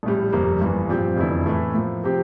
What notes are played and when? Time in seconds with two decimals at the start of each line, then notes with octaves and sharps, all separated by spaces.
0.03 A#1 A2 G3
0.32 G1 F2 C3 G3 A#3
0.61 G1 G2 E3
0.89 A#2 F3 C4 G4
1.17 F1 E2 D3 A3 E4
1.46 A2 E3 A3
1.74 A2 F3 A#3
2.04 C3 F3 C4 G4